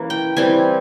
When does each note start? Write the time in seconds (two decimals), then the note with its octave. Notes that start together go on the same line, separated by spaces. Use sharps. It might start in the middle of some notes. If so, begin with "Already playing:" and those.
Already playing: E3 A#3 C#4
0.10 G5
0.37 E3 G3 C4 G#5